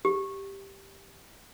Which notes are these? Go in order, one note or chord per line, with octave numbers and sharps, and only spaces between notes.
G4